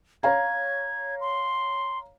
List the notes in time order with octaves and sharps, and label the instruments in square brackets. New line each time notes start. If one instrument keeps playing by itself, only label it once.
[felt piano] C#5 F5 A#5 [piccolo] G#6
[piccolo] C6